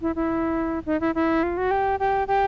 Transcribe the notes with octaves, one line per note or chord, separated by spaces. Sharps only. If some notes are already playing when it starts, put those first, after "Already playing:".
E4
E4
D#4
E4
E4
F4
F#4
G4
G4
G4